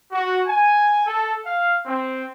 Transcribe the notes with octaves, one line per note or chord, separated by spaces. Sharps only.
F#4
G#5
A4
F5
C4